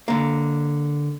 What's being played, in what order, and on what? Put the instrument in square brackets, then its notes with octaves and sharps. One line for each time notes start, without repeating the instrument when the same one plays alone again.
[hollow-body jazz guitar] D3 A#3